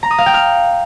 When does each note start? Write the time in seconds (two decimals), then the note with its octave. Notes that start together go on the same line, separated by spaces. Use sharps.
0.03 A#5
0.11 D#6
0.18 F5
0.26 G5
0.34 F6